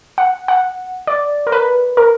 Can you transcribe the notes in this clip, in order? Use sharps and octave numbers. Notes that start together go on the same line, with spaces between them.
F#5
F#5
D5
A#4
B4
A#4